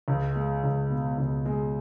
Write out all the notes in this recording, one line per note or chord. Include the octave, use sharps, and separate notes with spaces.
C#2
G#3
C#2
B2
C#2
G#3